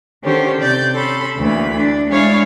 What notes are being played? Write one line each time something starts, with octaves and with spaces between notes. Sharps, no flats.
D3 D#3 C#4 G4 A4 C5
C3 D5 G6
C#4 A4 B5 C6
D2 E3 A#3 B5
D4
G#3 D4 E4 C#5 F5 G#5